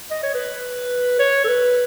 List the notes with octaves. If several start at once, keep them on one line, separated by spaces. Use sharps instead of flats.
D#5
C#5
B4
C#5
A4
B4